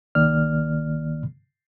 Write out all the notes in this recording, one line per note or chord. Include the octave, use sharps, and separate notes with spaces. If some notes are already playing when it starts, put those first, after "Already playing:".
C2 D#3 A#3 D5 F6